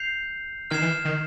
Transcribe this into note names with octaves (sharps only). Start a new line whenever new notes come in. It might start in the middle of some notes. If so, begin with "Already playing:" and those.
Already playing: G6 C7 F7
D#3 F6 G#6 C7 E7
E3
D#3